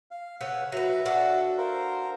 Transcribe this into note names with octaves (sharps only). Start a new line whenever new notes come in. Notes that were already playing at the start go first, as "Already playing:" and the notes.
F5
C#3 B4 C#5 F#5 E6
F#3 B4 E5
D4 F#4 A4
A#4 C5 F5